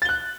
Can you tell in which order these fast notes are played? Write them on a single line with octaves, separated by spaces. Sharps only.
A6 G7 F#6